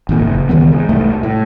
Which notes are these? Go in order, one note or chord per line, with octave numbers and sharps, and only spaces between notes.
G#1 A#2
F#1
C#2 D#3 E3 B3
G#2
C2 A3
A2